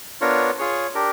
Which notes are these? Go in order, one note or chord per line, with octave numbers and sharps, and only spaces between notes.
B3 D4 F4 A#4 C#5
F4 G#4 C#5
D4 G4 A#4